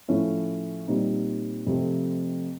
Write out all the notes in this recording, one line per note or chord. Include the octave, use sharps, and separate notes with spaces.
A2 F3 A3 C#4 E4
A#2 G3 C4 D#4
F2 C3 F3 A3 C4